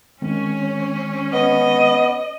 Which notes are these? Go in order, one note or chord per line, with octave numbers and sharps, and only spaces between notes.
D#3 G#3 C4 C#4
B3 D#5